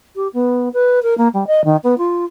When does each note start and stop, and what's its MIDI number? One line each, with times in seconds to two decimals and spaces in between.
0.16 0.28 67
0.34 0.69 59
0.73 0.99 71
1.03 1.16 70
1.18 1.28 58
1.34 1.47 55
1.47 1.64 75
1.64 1.76 51
1.83 1.95 59
1.98 2.25 65